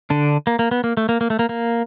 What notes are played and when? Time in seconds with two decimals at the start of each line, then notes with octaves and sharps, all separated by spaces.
0.10 D3 D4
0.47 A#3
0.59 A#3
0.71 B3
0.84 A#3
0.97 A3
1.09 A#3
1.21 A#3
1.30 A3
1.39 A#3
1.49 A#3